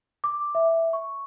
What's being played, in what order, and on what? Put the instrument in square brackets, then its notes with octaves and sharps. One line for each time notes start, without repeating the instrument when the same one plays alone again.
[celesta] D6
E5
C#6